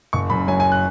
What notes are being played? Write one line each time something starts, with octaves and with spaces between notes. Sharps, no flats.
F#1 C#6
F#2 B5
F#3 G#5
G#5
F#6